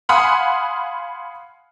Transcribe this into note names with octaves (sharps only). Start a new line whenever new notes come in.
F5 F#5 G#5 B5 C6 D#6